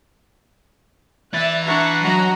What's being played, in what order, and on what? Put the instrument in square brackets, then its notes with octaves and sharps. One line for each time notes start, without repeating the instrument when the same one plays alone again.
[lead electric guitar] E3 E4 [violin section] D5 E5 F#6 [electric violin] A6
[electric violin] D4 F#5 [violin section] E5 A#5 C#6
[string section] F#3 F#4 [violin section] C#4 D#5 A#5